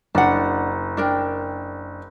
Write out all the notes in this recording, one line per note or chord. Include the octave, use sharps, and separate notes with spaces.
F#1 D4 F#5
D4 A#4 G5